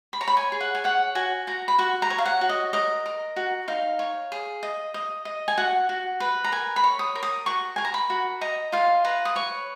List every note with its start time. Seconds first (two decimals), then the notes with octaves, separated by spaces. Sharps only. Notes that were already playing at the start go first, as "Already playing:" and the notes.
0.13 B5
0.21 C#5 A#5
0.28 B5
0.37 G#5
0.52 G#4
0.61 F#5
0.75 G#5
0.84 C#5 F#5
1.15 F#4 G#5
1.47 F#4 A#5
1.68 B5
1.78 F#4 C#6
2.02 A#5
2.10 C#5
2.18 F5
2.26 F#5
2.41 F#4
2.49 D#5
2.73 A#4 D#5
3.06 A#4
3.36 F#4
3.68 D#4 F5
3.99 C#5
4.32 G#4
4.63 D#5
4.94 D#5
5.25 D#5
5.48 G#5
5.58 F#4 F#5
5.89 F#4
6.20 B4
6.44 A#5
6.52 A#4 G#5
6.76 B5
6.84 C#5
6.99 D#6
7.16 A#4
7.23 D#6
7.46 F#4 C#6
7.76 A#4 G#5
7.85 A#5
7.94 B5
8.10 F#4
8.41 D#5 A#5
8.72 F4 F5
9.05 B4 A#5
9.25 D#6
9.36 C#5 C#6